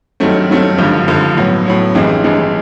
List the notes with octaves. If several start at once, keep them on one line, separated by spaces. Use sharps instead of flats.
G2 D#3 F#3 A3 C4
G2 D#3 F#3 A3 C4
G#1 G2 D3 F3
G#1 G2 D3 F3
A2 F#3 B3
A2 F#3 B3
A1 G2 E3 G#3 C4
A1 G2 E3 G#3 C4